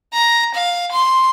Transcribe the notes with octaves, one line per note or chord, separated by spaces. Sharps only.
A#5
F5
C6